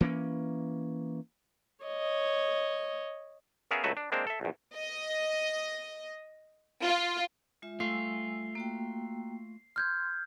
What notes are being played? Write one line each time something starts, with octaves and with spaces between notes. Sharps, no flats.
E3 A#3 B3 C#4
C#5 D#5
B3 C#4 G#4 A#4 E5 F5
C#2 F#3 A3 F#4 B4 E5
D4
G#3 A#3 C4 D4 A#4 C5
A4 E5
A#1 E2
D#5
F4
G#3 F4 E5
G3 A3 F4 G#5 E6 C7
A#3 F#4 G5
C6 F6 G6 G#6